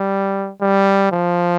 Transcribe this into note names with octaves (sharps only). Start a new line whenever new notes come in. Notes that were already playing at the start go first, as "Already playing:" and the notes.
Already playing: G3
G3
F3